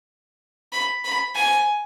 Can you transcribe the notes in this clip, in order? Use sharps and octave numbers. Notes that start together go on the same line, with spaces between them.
B5
B5
G#5